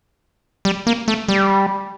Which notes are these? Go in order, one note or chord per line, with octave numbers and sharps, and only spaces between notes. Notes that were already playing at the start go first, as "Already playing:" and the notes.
G3
A#3
A3
G3